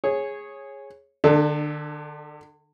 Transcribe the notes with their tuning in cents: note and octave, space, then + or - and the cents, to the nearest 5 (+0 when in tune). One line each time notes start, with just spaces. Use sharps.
G#4 -5 C#5 -15
D3 +40 D4 +20 A4 -15